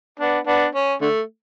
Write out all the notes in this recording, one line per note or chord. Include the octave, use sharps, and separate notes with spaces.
B3 D4
B3 D4
C#4
D3 A3